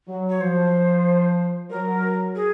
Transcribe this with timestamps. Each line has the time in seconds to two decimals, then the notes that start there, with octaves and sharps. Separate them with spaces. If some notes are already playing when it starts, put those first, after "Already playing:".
0.08 F#3
0.29 C#5
0.41 F3 C5
1.70 F#3 A#4
2.35 G#4